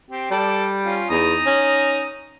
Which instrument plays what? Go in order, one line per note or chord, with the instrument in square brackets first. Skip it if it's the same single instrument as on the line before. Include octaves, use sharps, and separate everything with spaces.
[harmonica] C4 G4
[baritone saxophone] G3 [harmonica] A4 D5
[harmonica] C#4 F4
[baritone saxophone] E2 [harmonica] D#4 A#5 D#6
[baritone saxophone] C#4